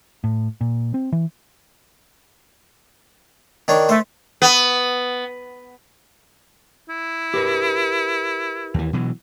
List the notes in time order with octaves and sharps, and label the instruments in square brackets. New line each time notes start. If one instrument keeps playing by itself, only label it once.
[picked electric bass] A2
A#2
C4
E3
[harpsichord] D#3 D4 C#5
[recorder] A3 [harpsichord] C5
[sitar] B3
[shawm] E4
[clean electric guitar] G4 A#4 B4
[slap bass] D#2 E3
B2 E3 F#3